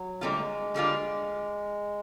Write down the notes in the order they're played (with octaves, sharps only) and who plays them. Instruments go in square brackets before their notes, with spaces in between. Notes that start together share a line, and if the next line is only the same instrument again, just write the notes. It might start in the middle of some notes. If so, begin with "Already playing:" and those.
Already playing: [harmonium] F#3
[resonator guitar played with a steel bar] D3 G3 A#3 D4 F4 [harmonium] G#3
[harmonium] A3
G#3
[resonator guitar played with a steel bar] D3 G3 A#3 D4 F4